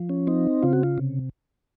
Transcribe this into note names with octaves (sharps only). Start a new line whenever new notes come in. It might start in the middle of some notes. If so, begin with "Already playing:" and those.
Already playing: F3
C#4
C4 D#4
C#3 F4
F#4
F4
C3